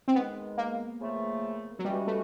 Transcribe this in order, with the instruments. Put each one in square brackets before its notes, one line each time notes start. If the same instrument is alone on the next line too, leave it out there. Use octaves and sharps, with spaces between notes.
[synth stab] C4
[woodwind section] G#2 D#3 G#3 [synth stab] B3
[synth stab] A#3
[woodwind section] C#3 F3 A3
[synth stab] F#3
[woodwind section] G2 E3 G#3 C#4 F#4 [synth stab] G3
[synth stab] A3